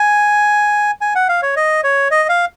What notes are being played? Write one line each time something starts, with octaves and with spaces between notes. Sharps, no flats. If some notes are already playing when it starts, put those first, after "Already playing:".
Already playing: G#5
G#5
F#5
F5
C#5
D#5
C#5
D#5
F5